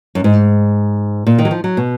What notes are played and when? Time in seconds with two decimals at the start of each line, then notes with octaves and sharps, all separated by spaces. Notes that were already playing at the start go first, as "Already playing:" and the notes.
0.15 F#2
0.24 G#2
1.27 A#2
1.38 D#3
1.45 F#3
1.51 F3
1.64 F#3
1.77 B2